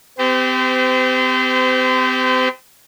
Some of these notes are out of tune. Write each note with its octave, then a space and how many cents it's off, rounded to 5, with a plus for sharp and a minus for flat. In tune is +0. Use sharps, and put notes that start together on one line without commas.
C4 -40 G4 +0 C5 -35